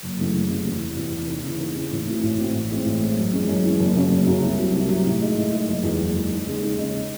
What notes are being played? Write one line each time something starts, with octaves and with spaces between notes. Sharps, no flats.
F#1
F#2 C#3 E3 A3
F#1
F#2 C#3 E3 A3
E2
C3 E3
E2
C3 E3
D#2
C#3 E3
D#2
C#3 E3
A1
A2 E3 C4 F#4
A1
A2 E3 C4 F#4
A1
A2 G#3 C4
A1
A2 G#3 C4
F#2
E3 G#3 C#4
F#2
E3 G#3 C#4
F#1
F#2 C#3 F#3 C#4
F#1
F#2 C#3 F#3 C#4
C2
C3 F#3
C2
C3 F#3
A2
G#3 D#4
A2
G#3 D#4
F#1
E2 D#3 G#3
F#1
E2 D#3 G#3
D#2
C#3 G#3 D#4
D#2
C#3 G#3 D#4